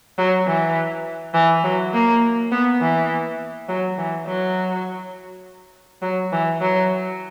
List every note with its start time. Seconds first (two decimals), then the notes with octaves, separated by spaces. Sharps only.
0.18 F#3
0.47 E3
1.34 E3
1.64 F#3
1.94 A#3
2.51 B3
2.81 E3
3.68 F#3
3.98 E3
4.27 F#3
6.02 F#3
6.32 E3
6.61 F#3